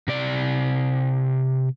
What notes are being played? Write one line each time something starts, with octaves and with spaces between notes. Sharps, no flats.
C3 D5